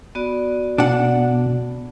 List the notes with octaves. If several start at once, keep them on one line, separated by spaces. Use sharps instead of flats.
B3 F#4 D5
B2 D4 F#5